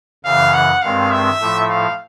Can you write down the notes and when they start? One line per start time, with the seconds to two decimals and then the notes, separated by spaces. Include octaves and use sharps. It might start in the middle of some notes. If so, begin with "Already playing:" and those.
0.24 F#2 C#3 E3 F5
0.54 F#5
0.82 G2 D#3 G#3 C4 F5
1.11 E5
1.40 A2 F3 A3
1.70 F5